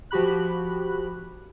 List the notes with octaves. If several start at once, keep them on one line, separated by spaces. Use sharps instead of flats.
F3 F#4 G4 B5 F#6